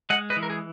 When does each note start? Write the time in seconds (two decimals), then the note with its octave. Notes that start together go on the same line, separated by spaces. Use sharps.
0.10 G#3 D#5 F#5
0.30 B4 D#5
0.36 E3
0.43 A#4
0.50 G#4